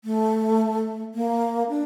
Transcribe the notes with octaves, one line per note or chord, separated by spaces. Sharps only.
A3
A#3
D4